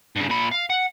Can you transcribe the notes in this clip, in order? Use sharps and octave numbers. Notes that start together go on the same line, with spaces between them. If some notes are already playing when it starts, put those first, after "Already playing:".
G2 C#3
A#2 B5
F5
F#5